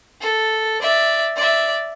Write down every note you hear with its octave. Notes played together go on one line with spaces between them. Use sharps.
A4
D5 E5
D5 E5